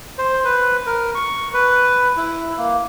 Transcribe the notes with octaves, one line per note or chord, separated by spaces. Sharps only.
C5
B4
A#4
C#6
B4
E4
A#3